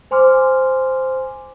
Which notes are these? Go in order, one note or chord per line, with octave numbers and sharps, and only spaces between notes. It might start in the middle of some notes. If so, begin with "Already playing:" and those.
C5 G#5 C6 D6 F6